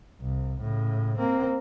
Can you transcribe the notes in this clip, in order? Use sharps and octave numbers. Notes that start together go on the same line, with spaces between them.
C2
A2 C#3
A#3 C4